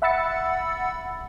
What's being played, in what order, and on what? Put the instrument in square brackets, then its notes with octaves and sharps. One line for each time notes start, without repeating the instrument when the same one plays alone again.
[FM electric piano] E5 F#5 B5 E6 A6 C#7